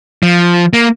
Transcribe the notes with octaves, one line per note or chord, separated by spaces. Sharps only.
F3
A#3